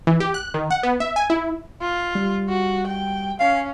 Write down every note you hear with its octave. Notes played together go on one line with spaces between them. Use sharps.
E3
G4
F#6
D#3
F#5
B3
E5
G#5
E4
F4
G3
F#4
G5
C#4 F5